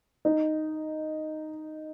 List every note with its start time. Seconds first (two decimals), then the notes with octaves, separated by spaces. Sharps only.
0.25 D#4